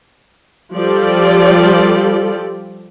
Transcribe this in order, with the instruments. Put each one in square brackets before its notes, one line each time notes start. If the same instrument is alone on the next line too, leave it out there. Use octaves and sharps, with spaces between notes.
[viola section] F3 G3 F4 G4 A4 D5